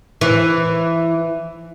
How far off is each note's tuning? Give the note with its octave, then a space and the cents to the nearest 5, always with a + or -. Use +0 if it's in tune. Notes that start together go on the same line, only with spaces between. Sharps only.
E3 +10